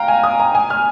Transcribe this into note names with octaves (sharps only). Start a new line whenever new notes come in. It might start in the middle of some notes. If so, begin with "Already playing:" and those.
Already playing: F5 G5 A#5
G#5
D#6
A#5
G#5
F6